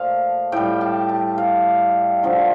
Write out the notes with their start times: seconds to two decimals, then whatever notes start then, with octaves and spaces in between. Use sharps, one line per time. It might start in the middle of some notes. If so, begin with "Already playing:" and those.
Already playing: A#2 F3 A3 F5
0.52 A2 G3 G5
0.81 A5
1.09 A5
1.38 F5
2.23 D3 F3 A3